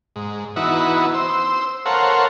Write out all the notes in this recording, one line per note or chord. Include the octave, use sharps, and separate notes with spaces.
G#2
E3 B3 D#4 E4 F#4
C5 E6
A4 A#4 C5 C#5 F5 F#5